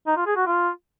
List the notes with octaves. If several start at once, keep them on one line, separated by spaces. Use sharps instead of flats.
D#4
F4
G#4
F#4
F4